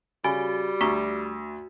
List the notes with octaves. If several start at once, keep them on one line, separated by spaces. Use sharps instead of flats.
C#3 G3 F#4 G#5
D2 A#5 C#6 B6